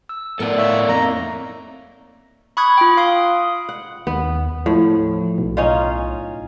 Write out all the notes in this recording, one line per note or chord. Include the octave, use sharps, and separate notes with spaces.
E6
A2 B3 A4 A#4 D5
C#5 E5 F5 C#6
F2 A#3 D#4 A#5
B5 C#6 D#6 F#6 G#6
F4 G5
F5 C6 D#6
F#5
D#2 B3
A2 F3
B1
C#4 D#4 F4